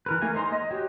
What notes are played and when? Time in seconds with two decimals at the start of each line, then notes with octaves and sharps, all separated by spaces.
0.06 E3 A#4 B4
0.22 A3 A#3 A#4 G#5
0.35 D#4 C5 A#5 C6
0.52 D#5
0.71 F#4 G4 C#5